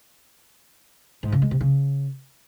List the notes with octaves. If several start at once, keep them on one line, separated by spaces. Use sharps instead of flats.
G#2
C#3
G#3
C3
C#3